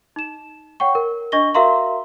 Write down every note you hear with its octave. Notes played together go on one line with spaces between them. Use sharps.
D#4 E7
C#5 F#5 G5 C#6
A#4
D4 D#5 C#6 A#6 G7
F#4 A#4 E5 F5 A#5 C6